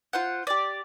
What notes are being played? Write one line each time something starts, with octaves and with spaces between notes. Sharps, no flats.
F4 C5 F#5
G4 D5